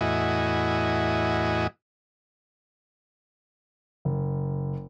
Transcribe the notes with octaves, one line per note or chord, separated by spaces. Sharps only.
E2 A2 E4 F#4 D#5 G#5
F#1